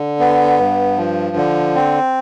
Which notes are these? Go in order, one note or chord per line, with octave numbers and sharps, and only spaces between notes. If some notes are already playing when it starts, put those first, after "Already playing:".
Already playing: D3
B3
G2
F3
D3
C4